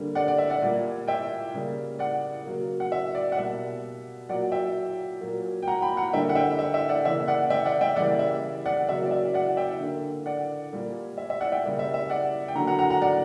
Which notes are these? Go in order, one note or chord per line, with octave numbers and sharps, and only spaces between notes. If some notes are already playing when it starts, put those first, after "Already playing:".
Already playing: D3 G3 A#3
D5 F#5
D5
E5
D5 F#5
A#2 G3 A#3
E5 G5
C#3 G3 A#3
D5 F#5
C#3 F#3 A#3
F#5
E5
D5
F#5
B2 G3 A#3 E5
A#2 F#3 A#3 D5 F#5
E5 G5
A#2 F#3 A#3
G5
F#5 A#5
G5 B5
F#5 A#5
D3 G3 A#3 E5 G5
F#5
E5 G5
E5
E5
D5 F#5
C#3 E3 A#3 E5
D5 F#5
E5 G5
D5 F#5
E5 G5
C#3 E3 G3 A#3 D5 F#5
E5
D5 F#5
C#3 F#3 A#3 E5
D5
E5
D5 F#5
E5 G5
D3 A#3
D5 F#5
A#2 G3 A#3
E5
E5
D5 F#5
E5 G5
C#3 G3 A#3
E5
E5
D5 F#5
G5
D3 F#3 A#3 F#5 A#5
F#5 A#5
F#5 A#5
F#5 A#5
D5 F#5